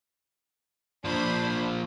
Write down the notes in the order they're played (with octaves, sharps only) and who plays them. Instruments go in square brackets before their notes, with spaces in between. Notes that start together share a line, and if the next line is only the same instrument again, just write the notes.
[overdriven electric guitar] A#2 F3 [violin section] D4 C5 B5